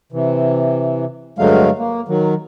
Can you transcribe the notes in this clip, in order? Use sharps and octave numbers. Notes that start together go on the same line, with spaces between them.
C3 E3
G2 D3 F#3 G#3 A3 F5
A#3
D#3 F#3